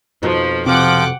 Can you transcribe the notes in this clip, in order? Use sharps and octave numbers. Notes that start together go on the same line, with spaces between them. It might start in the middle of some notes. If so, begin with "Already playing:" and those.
F2 B2 F3 D#4
C3 F3 F#5 G5 D6